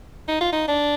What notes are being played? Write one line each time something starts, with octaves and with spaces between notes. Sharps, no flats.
D#4
F4
D#4
D4